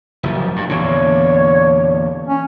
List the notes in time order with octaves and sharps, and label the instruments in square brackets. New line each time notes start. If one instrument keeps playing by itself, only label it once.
[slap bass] F#1 F3
G2
[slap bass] E2 A#2 D3 [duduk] C#5
[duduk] C#4